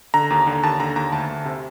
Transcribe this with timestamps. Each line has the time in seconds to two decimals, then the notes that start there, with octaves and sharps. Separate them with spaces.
0.14 D3 A#5
0.30 D#2
0.47 D3
0.63 D#2 A5
0.80 D3 A#5
0.96 D#2 A#5
1.12 D2 A5
1.29 D2
1.45 C3